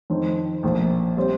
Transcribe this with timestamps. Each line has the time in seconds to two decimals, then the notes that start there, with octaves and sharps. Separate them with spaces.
0.10 F2 D#3 C4
0.63 A#1 A#2 F3
1.17 G3 C4